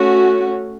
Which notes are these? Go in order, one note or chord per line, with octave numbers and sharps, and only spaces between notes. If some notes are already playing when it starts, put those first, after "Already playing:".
Already playing: A3 C#4 F#4